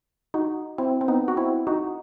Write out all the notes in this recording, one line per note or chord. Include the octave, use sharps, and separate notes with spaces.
D#4 F#4
C4 E4
C4
B3 D#4
F#4
C4 E4
D#4 F#4